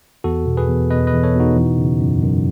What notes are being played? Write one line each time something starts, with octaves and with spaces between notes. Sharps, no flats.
E2 F#4 A4
B2
G#4 B4
E2
B2 B4 D#5
B4 D#5
E2
A4 C#5
B2 D#4 F#4
E3
C#3
F#2
F#2